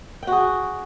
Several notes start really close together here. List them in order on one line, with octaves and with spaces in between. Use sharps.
G5 F#4 G#4